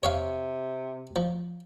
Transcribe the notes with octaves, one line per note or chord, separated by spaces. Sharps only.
C3 C#5 E5 F5
F3